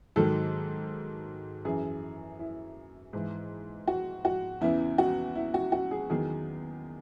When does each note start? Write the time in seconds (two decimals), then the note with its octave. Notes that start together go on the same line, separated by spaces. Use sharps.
0.16 G#2 D#3 F#3 A4
1.65 F#2 E3 G#4
2.39 E4
3.13 G#2 E3
3.88 F#4
4.25 F#4
4.61 E2 C#3 E3 E4
4.98 F#4
5.35 E4
5.54 F#4
5.72 F#4
5.91 G#4
6.10 E2 D#3 F#3 G#4